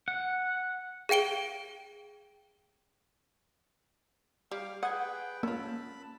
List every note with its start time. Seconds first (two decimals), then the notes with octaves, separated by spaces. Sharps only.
0.08 F#5
1.09 G#4 F5 G5 D7 G7
4.51 G3 F5 D6
4.83 G#4 B4 F#5 G5 D#6 F#6 G#6
5.43 A#3 C#4 F4 A5 B5